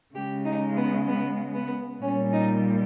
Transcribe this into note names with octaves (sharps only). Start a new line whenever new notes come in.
C#3 G#3 G4
D#4
B3
B3
B3
A#2 G3 C#4
D#4